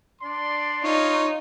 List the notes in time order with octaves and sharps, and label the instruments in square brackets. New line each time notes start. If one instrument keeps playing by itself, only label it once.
[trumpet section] D4 D5 C6
[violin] D#4 [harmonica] F4 C#5